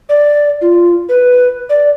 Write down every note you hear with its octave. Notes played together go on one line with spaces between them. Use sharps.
D5
F4
B4
D5